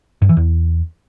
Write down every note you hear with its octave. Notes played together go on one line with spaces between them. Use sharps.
G2
E3
E2